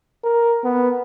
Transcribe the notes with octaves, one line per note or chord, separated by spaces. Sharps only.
A#4
B3